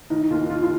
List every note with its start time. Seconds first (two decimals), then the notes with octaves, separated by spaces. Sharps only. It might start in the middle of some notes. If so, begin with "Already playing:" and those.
0.10 D#3 D#4
0.30 D#2 F4
0.50 D#3 F4
0.62 F4